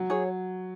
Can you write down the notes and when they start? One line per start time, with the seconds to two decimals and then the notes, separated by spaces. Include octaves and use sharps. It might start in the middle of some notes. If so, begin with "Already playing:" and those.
Already playing: F#3
0.10 G#4 C#5